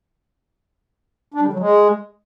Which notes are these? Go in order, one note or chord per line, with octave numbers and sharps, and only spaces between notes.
D4
G3
D3
F#3
G#3